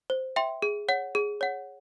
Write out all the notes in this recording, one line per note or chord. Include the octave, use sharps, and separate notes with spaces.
C5
E5 G5 C6
G#4
C#5 F#5
G#4
C#5 F#5